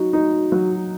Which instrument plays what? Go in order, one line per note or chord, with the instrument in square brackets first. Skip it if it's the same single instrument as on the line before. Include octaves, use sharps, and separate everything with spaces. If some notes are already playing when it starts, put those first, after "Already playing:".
Already playing: [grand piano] F#3 D#4 [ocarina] F#4
[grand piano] D#4
F#3